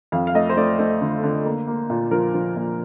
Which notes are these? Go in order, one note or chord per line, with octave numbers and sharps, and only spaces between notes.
F2 F5
F5
A3 D#5
C5
A3 D5
A3 C5
D3
D3
A#3
A#3
A#2
F3 A#4
F3
A#2